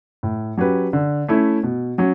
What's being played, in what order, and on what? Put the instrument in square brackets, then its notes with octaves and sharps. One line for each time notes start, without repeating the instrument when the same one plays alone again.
[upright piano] A2
F#3 C#4 G4 B4
D3
A3 C#4 E4
B2
F#3 C#4